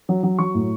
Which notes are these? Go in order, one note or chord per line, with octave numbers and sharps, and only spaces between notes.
F#3
F#3
F#3 C#6
A2